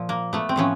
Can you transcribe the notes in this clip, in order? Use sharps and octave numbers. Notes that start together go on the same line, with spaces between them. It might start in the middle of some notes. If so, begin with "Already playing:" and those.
Already playing: A#2 F3
A#3
A3 B3
C4
A2 F3 B3 C#4